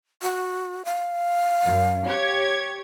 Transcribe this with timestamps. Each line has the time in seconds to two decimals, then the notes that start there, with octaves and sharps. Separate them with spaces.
0.22 F#4
0.85 F5
1.64 F#2
2.06 G4 C#5 G#6